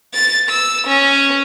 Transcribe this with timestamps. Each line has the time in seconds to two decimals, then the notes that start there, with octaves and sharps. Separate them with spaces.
0.14 A6
0.50 E6
0.87 C#4